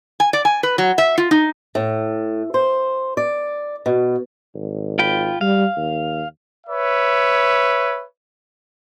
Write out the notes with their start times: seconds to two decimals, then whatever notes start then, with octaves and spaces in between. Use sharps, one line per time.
0.20 G#5
0.33 D5
0.45 G#5
0.63 B4
0.78 F#3
0.98 E5
1.18 F4
1.31 D#4
1.75 A2
2.54 C5
3.17 D5
3.86 B2
4.55 G#1
4.99 F4 G5 B5
5.41 G3 F5
5.77 D#2
6.67 B4 C#5 E5